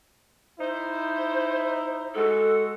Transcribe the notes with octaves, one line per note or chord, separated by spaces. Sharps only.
D#4 E4 C5
G#3 F#4 A4